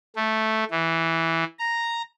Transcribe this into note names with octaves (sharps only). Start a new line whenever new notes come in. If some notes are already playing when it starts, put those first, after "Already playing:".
A3
E3
A#5